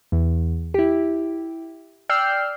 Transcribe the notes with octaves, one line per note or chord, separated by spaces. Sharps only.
E2
E4 G4
D5 G5 E6 F6 G6 C7